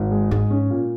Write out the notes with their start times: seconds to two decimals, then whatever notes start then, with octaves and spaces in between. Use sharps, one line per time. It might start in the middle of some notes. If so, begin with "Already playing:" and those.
Already playing: G#1
0.11 G#3
0.31 G#2 G#3
0.50 C#4
0.70 A#2